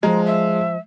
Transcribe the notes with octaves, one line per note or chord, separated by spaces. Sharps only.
F3 G#3 A#5
E5